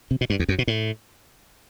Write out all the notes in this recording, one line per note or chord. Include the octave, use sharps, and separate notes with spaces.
C3
B2
G2
E2
F#2
B2
A2